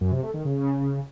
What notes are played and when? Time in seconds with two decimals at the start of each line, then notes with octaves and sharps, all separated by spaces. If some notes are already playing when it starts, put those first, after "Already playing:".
0.01 F#2
0.12 C3
0.23 A3
0.34 D#3
0.45 C#3